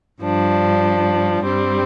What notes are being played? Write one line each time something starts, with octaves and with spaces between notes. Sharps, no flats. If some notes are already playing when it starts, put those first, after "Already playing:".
G2 F3 D4
G2 G3 C4